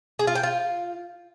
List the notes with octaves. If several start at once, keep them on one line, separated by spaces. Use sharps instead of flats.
G#4
F4
G5
F4